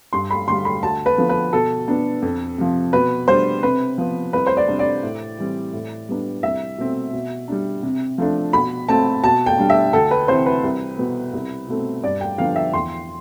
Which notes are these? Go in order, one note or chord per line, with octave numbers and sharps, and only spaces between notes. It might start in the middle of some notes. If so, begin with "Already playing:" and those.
G2 C6
B5
D3 G3 C6
B5
D2 A5
B4
D3 F3 B3
B4
B2 A4
B3 D4
F2
C3 F3
B2 B4
G3 D4 C5
C3 B4
F3 B3
C2 B4
C5
D5
C3 G3 D4
D5
A2
E3 G3 C4
A2
G3 B3 D4
C2 E5
B2 A3 C4
B2
G3 D4
C3
F3 A3 D4
B2 B5
A3 C4 A5
B2 A5
G5
G3 D4
E5
D2 A4
B4
C3 E3 C5
B4
C2
B2 B3
C2
B2 A3 C4
G2 D5
G5
D3 F3 B3 D4 F5
E5
E2 C6